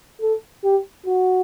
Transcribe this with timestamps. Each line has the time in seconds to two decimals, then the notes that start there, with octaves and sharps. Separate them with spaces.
0.21 A4
0.64 G4
1.06 F#4